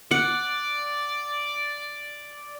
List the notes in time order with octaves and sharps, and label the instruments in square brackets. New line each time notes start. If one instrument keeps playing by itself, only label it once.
[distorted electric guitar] D5 [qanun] F#5